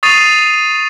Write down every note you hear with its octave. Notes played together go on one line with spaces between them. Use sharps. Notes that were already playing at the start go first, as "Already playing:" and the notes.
C#6 D#6 A6 C7 D#7 F7